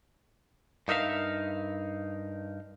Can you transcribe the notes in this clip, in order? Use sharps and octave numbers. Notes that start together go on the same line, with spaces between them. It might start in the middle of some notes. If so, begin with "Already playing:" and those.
G2 D#4 A#4 E5 F5